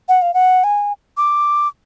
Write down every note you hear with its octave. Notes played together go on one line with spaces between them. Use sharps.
F#5
F5
F#5
G#5
D6